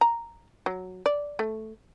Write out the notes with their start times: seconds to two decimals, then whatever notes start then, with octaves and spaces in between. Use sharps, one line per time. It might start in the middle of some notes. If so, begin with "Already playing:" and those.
0.01 A#5
0.66 F#3
1.06 D5
1.39 A3